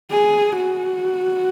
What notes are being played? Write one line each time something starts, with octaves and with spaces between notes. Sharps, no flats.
G#4
F#4